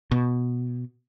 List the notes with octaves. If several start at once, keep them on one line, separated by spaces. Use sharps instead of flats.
B2